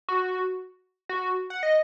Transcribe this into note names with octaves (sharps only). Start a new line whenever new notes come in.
F#4
F#4
F#5
D#5